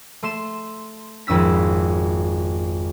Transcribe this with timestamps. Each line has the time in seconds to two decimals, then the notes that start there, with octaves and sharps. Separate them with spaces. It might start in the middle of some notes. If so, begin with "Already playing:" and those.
0.23 A3 C6 E7
1.27 G#1 F2 C#4 E6 B6